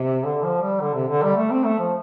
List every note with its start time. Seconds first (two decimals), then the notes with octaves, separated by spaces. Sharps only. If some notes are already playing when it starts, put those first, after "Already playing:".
Already playing: C3
0.25 D3
0.43 F3
0.62 G3
0.81 D3
0.95 C3
1.08 D3
1.23 G3
1.36 A3
1.51 C4
1.65 A3
1.79 F3